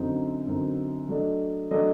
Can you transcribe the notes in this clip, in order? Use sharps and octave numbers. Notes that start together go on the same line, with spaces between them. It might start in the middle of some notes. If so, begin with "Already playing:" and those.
Already playing: F#2 D3 F#3 C4 D#4
F#2 D3 F#3 C4 D#4
F#3 A3 D4 A4 D#5
F#3 A3 D4 A4 D#5